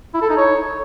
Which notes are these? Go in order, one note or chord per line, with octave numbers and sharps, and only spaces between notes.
E4
A4
D#4
C#5